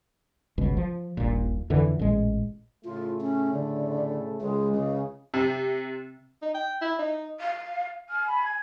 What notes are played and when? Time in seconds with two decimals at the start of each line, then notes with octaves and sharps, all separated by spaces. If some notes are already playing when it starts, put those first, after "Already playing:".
0.58 G1 C#2 G#2 B2
0.77 F3
1.17 D#1 A#1 A#2
1.70 F2 D3 E3
1.99 A1 A#2 G#3
2.85 A2 C#3 A3 F4
3.21 C#4
3.53 D3
4.40 C#2 G#3
4.74 C#3
5.34 C3
6.42 D#4
6.55 G5
6.81 E4
6.99 D#4
7.40 F5
8.09 G#5 F6
8.27 B5
8.45 G#6